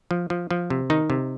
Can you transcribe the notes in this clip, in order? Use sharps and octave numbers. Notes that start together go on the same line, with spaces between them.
F3
F3
F3
C3
D#3 D#4
C3